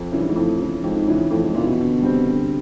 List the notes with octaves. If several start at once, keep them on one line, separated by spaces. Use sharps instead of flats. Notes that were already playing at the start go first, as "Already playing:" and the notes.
Already playing: F2
F#2 C#3 E3
G2
G#2
F2 A2
C#3 E3
F2 G#2
C#3 E3
F2 A2
G#2
A#2 C#3 E3
B2
D3
G3 C4
D3